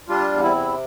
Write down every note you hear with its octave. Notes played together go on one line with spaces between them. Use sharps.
G3 D4 F4
E2
C4 E4
C3